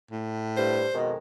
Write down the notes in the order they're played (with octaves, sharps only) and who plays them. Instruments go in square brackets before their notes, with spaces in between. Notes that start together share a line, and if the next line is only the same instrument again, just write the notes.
[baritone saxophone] A2
[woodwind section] G2 [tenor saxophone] C5
[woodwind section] F2 D#3 G#3 [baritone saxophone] B2